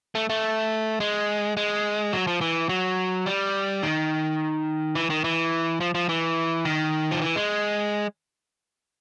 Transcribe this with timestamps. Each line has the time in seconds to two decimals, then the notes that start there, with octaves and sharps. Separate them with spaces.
0.15 A3
0.30 A3
1.00 G#3
1.57 G#3
2.13 F#3
2.27 F3
2.41 E3
2.69 F#3
3.26 G3
3.83 D#3
4.95 E3
5.10 D#3
5.24 E3
5.80 F3
5.95 F3
6.09 E3
6.65 D#3
7.11 F3
7.22 E3
7.36 G#3